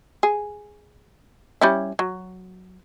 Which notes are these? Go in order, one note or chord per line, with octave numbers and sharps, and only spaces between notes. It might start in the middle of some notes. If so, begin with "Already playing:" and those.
G#4
G3 C#4 E4
F#3